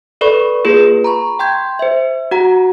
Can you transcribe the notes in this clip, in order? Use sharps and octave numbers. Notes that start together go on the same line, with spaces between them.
A4 B4 D5 B5 C#6
A#3 F4 G#4 B4
A#5 B5 C#6
G5 C6 G6 G#6
C5 E5
F#4 F#5 A#5